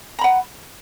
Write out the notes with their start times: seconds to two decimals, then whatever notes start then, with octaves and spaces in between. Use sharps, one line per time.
0.19 A#5
0.21 B5
0.24 F#5